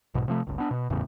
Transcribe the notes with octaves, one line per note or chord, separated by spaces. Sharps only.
B1 G#2 B2
C3 F3 A3
G1 C#2
B3 D4
B2
G#1 E2 A2 C#3